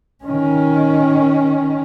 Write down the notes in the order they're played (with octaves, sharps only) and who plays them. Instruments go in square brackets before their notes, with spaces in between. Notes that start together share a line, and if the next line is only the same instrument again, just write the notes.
[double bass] D#3 C#4